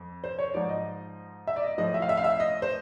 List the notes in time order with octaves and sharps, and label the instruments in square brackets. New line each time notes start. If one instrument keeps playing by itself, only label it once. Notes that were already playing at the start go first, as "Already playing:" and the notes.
Already playing: [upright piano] F2
C5
C#5
G#2 F3 D5
D#5
E5
D5
D#5
A2 F3 D#5
E5
F5
E5
F5
E5
D#5
C5